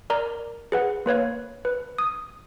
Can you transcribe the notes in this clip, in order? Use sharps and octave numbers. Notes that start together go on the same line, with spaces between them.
A#4 D5 A#5
G#4 B4 F#5
A#3 B4 C#5 F5
B4
D#6